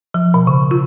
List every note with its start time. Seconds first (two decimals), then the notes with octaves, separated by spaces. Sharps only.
0.14 F3
0.34 B2
0.47 C#3
0.71 F4